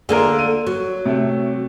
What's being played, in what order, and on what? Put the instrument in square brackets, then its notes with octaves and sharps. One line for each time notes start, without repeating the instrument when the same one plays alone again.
[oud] D3 A#3 F4 [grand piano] G#4 A#4
[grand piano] D#7
[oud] F#3
[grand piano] C3 A3